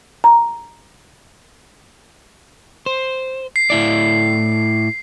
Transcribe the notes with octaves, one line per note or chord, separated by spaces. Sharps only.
A#5
C5
C7
A2 E4 D5